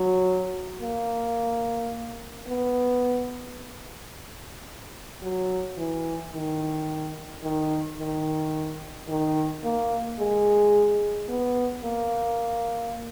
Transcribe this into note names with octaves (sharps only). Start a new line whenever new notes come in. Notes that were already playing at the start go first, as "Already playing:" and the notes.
Already playing: F#3
A#3
B3
F#3
E3
D#3
D#3
D#3
D#3
A#3
G#3
B3
A#3